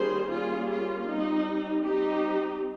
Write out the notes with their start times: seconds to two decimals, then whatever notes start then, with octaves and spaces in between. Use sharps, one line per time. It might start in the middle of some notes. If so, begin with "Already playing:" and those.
Already playing: D#3 G3 A#3 C#4 G#4 C5
0.31 G3 A#3 C#4 F4 G#4
0.70 F4
1.08 G3 C4 D#4
1.85 G3 C4 D#4 G4